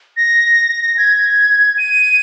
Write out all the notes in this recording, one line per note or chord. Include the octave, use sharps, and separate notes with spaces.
A#6
G#6
D#7